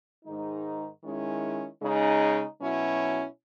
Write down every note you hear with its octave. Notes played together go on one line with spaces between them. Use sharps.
G#2 D#3 G#3 D#4
D#3 G#3 C#4 E4
C#3 G#3 D#4
B2 F#3 C#4 E4